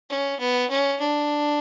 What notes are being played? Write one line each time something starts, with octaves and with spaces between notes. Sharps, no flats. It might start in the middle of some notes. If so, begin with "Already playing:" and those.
C#4
B3
C#4
D4